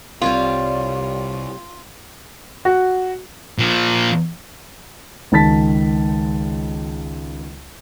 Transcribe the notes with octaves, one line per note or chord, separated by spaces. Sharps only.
C2 C3 G3 F4 C#5 D5
F#4
A#2 F3
C#2 D#3 A5 A6 B6